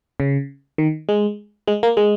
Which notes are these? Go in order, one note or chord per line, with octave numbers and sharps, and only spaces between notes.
C#3
D#3
G#3
G#3
A#3
G#3